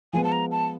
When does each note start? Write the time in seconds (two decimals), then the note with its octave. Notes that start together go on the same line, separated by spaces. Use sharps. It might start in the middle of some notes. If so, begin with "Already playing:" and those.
0.13 F3 G#3 B3 G#5
0.24 A5
0.32 A#5
0.52 A5